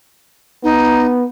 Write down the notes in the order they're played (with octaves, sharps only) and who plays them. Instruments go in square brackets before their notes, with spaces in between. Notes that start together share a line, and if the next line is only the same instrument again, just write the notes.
[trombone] B3 [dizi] D#4